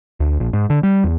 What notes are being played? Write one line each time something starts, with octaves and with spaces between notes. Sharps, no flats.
D2
A#1
G#2
D3
G3
E2